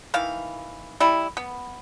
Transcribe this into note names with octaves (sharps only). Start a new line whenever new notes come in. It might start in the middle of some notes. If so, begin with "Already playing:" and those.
D#3 E3 F5
G3 E4
B3